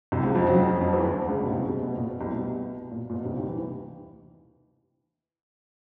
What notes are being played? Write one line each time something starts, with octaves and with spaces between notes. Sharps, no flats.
C2 C3
C#2 C#3
F2 F3
F#2 F#3
F2 F3
F#3
F2 F3
E2 E3
D2 D3
C#2 C#3
B2
C2 C3
B2
B2
A#2
B2
C2 C3
B2
A#2
A#2
B2
C2 C3
D#2 D#3
E3